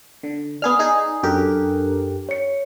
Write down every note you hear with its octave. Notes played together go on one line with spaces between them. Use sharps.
D3
B3 G#4 D5 D#6 F6
D#4 G#4
F#2 D4 G4 A4 A#4 F#6
C#5 C#7